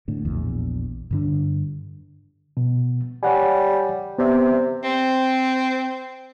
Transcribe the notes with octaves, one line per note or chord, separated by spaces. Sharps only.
A2 D3
A#1 E2
G2 D3 D4
B2
G3 C#5 F#5 G#5
C3 B3 D5 E5
C4